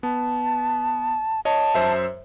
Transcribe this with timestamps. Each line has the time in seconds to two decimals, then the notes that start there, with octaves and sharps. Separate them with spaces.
0.03 B3 A5
1.45 C#5 D#5 A5
1.75 F#2 C5 E5